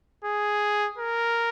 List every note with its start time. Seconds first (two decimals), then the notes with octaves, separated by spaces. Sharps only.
0.24 G#4
0.98 A#4